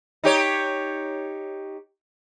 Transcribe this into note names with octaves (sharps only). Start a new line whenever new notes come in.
D#4 G4 C#5